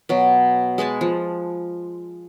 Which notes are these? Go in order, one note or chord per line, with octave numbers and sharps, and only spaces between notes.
B2 F#3
G#3 B4 G#5 A5
F3